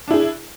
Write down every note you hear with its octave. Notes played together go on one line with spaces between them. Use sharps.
D4 E4 G#4